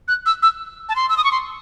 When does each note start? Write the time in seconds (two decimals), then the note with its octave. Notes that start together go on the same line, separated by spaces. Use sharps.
0.08 F#6
0.26 E6
0.42 E6
0.89 A5
0.96 C6
1.09 E6
1.17 D#6
1.24 C#6
1.32 C6